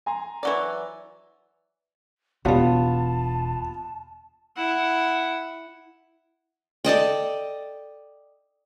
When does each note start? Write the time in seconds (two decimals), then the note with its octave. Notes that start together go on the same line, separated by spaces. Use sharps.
0.06 G#5 A#5 C6
0.43 E3 F#3 D5
2.45 E1 F#3 G3 B3 F4 A5
4.57 E4 F#5
6.85 A4 D5 D#5 G5